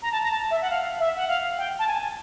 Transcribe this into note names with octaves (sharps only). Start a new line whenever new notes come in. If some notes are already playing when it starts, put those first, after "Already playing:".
A#5
A5
A#5
A5
E5
F#5
F5
E5
F#5
F5
G5
A5
G#5